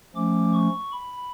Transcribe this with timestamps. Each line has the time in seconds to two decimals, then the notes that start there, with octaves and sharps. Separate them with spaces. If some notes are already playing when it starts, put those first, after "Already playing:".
0.15 F3 A3 C#4 D6
0.53 C#6
0.92 B5